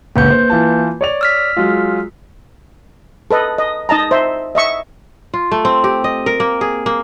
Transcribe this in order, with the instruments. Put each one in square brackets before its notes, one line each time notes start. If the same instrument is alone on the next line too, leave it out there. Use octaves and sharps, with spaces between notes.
[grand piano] G1 C#2 [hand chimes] A#3 B4 G6
[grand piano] C5
E3 F4 A5
C#5 D5 F7
[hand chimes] E6 F6 B6
[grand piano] F#3 G#3 F4
[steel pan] A4 B4 D#5
D#5
D#4 D#5 A5 A#5
C5 E5
D#5 E5 C#6
[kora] F4
A3
C4
G4
D#5
A#4
A#3
G#4
A#3